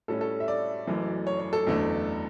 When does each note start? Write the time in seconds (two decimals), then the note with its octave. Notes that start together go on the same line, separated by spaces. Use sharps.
0.08 A2 G3 C#4 A4
0.21 A4
0.40 E5
0.48 D5
0.87 F#1 F#2 E3 A3
1.27 C#5
1.40 C#5
1.53 A4
1.66 F#1 E2 D3 A3